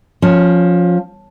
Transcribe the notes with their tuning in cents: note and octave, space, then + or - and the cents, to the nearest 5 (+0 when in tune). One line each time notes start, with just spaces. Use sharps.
F3 +15 C#4 +0